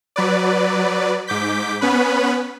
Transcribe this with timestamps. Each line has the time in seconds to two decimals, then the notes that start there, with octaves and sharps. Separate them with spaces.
0.16 F#3 B4 D5
1.27 G#2 D6 G6 B6
1.81 B3 C#4 B4 B5